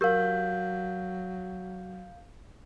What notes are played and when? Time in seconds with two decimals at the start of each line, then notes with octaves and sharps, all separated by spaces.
0.01 F#3 G4 A#4 F5 G6